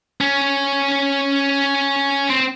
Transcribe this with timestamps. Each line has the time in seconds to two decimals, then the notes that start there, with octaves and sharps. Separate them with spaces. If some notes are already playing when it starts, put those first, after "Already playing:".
0.21 C#4
2.30 C4